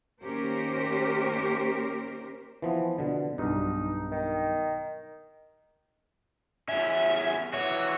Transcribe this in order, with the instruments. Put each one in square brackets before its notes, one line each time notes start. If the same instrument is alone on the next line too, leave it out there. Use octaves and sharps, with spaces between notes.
[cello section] D#3 A#3 C#4 G4 A#4 C5
[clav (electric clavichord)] E3 F3 B3
B2 D3
[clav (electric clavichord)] B1 G2 [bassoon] D#4
[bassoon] D#3
[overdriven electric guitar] E2 C#4 [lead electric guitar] E5
[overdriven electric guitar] E3 F#4 [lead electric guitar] C#5